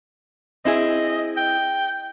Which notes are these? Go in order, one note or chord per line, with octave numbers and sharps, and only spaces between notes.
C4 E4 G#4 D#5
G5